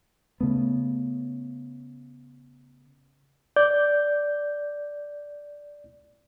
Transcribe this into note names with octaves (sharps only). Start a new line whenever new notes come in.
C#3 A3 B3
D5 G6